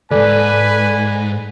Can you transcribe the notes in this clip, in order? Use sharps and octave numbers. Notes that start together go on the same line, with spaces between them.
D2 G#2 A4 B4 D5 G#5